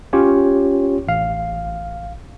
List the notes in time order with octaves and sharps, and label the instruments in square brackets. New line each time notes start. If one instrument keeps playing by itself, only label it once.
[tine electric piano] C#4 F4 G4 C#5
A1 F5